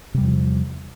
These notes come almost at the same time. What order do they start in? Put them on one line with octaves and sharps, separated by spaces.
C3 G3 E2 F3